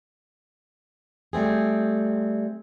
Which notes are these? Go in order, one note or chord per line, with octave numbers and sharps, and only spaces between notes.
G3 A3 C4 G#4